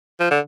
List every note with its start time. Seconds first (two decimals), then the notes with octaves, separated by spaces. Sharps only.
0.20 F3
0.31 D3